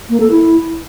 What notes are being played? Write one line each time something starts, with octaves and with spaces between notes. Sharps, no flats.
A#3
A4
E4